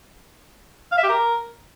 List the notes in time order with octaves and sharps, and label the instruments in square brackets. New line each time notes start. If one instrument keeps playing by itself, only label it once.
[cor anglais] F5
E5
G4
A#4